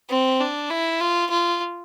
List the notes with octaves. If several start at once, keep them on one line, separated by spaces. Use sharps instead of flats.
C4
D4
E4
F4
F4